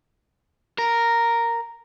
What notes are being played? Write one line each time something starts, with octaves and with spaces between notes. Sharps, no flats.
A#4